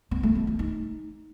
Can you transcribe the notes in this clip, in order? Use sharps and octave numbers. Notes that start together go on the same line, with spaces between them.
B3
A3
B3
A3
D#4